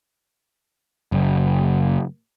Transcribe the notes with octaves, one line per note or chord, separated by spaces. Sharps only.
F#1